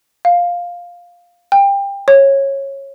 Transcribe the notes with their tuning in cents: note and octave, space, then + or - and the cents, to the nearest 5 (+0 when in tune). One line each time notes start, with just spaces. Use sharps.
F5 +5
G5 +25
C#5 -15